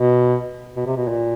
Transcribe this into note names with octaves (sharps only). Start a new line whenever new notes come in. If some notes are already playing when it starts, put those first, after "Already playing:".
Already playing: B2
B2
C3
B2
A#2